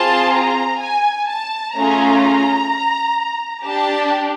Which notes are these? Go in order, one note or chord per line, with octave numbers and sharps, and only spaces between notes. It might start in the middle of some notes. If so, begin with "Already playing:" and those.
Already playing: C4 F4 G#4 A5
A#5
G#5
A5
A3 C#4 F4 G#4 A#5
D4 G4 A5